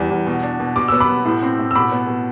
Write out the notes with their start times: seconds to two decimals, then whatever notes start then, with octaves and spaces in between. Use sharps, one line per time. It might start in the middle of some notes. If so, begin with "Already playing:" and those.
Already playing: E2 G3
0.10 E2
0.27 B2
0.43 D4
0.60 B2
0.76 B2 D6
0.88 B3 E6
1.00 B5 D6
1.09 B2
1.25 A2
1.43 C4
1.59 A2
1.71 E6
1.75 B2 B5 D6
1.92 B3
2.08 B2